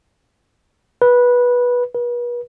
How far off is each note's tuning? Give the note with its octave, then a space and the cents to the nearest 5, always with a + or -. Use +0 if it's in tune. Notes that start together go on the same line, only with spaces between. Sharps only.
B4 -15
B4 -40